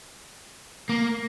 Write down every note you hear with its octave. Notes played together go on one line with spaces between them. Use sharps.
A#3